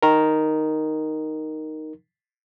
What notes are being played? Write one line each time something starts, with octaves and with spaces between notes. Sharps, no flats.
D#4 A#4